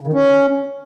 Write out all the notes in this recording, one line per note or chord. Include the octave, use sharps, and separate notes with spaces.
C#3
D#3
C#4